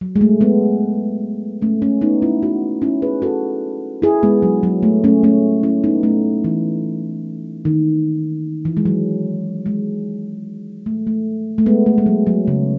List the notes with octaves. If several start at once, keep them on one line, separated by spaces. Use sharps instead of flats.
F#3
G#3
A3
G#3 B3
A3 C#4
A3 C#4
B3 D#4
C#4 E4
D#4 F#4
C#4 E4
G#4 B4
F#4 A4
E4 G#4
G#3 B3
F#3
F#3
A3
A3 C#4
A3 C#4
C#4 E4
B3 D#4
A3 C#4
E3
D#3
E3
G#3
F#3
G#3
A3
A3
A3
G#3 B3
A3
G#3
F#3
F#3
C#3